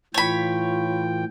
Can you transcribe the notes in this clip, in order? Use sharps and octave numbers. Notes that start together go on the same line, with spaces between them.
A2 E3 F4 C#5 G5 B5